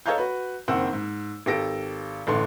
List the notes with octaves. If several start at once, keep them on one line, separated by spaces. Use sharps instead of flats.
A4 C#5 D#5 F5 A#5 G6
F#4 B4
F#1 D#3 C4 F#5 E6
G#2
G#1 G4 A4 A#6 D7
A1 A2 D3 C6